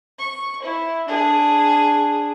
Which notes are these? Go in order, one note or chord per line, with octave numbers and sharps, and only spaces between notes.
C#6
E4
D4 G#4